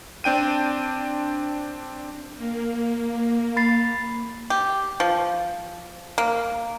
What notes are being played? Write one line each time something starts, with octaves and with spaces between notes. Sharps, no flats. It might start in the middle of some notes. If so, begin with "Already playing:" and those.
C4 D4 G5 D#7
A#3
B5 A6 C7
G4
F3
A#3